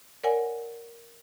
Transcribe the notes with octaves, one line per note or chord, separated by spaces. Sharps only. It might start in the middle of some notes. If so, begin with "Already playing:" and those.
A#4 C#5 D5 F#5 G#5